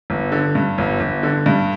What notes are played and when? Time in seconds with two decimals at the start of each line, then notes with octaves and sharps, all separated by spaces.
0.10 G1
0.32 D3
0.55 G2
0.78 G1
1.00 G1
1.23 D3
1.46 G2